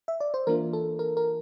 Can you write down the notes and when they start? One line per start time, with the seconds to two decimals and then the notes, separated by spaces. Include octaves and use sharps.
0.08 E5
0.20 D5
0.34 C5
0.47 E3 A#3 D4 F4 A#4
0.73 A4
0.99 A#4
1.17 A#4